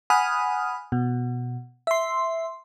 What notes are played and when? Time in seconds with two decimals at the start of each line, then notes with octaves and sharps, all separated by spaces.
0.10 F#5 G#5 B5 D#6 F6
0.92 B2
1.87 E5 C6